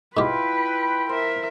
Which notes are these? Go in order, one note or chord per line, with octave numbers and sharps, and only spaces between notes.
G#2 E4 F4 G4 B4 G5 B5
A#4 C5 E5